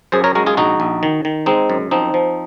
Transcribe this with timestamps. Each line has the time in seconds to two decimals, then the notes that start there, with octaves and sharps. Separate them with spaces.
0.12 F#2 G#4 C5
0.24 A#4 C#5
0.35 G#3 F#4 A#4
0.46 F4 G#4
0.57 A#1 D#4 F#4
0.80 A#1
1.03 D#3
1.25 D#3
1.46 G#3 C4 D#4
1.70 F#2
1.91 F3 C4 D#4
2.14 F3